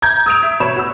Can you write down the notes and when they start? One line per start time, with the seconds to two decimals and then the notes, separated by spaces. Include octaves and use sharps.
0.02 A#5 G6 G#6
0.26 D#6 E6 G#6 D7 F7
0.43 E5
0.60 B2 C#5 B5 E7
0.76 F#4 E6